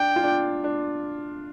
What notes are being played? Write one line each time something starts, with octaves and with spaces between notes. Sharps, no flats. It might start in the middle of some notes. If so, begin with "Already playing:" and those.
Already playing: D4 G5
F4
D4
D4